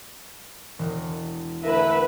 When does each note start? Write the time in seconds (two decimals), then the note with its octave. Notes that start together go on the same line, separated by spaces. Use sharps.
0.79 E1
1.64 D3 A3 E4 A#4 B4 E5 B5